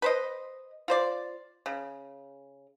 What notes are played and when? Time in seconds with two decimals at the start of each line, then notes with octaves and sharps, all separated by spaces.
0.02 B4 C5 D#5
0.88 F4 C5 D5
1.66 C#3